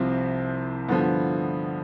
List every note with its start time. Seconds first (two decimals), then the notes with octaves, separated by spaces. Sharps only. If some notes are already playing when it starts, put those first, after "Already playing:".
Already playing: C2 C3 F3 C4
0.88 G2 D3 F3 B3